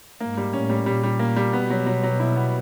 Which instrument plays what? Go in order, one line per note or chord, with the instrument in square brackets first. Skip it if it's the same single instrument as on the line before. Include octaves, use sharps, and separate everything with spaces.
[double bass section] G#2 [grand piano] A#3
[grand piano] G3
[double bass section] A2 [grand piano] C#4
[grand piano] G3
[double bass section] A#2 [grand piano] G3
[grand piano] G3
A#3
G3
[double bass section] B2 [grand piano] B3
[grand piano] F#3
F#3
F#3
E4
B3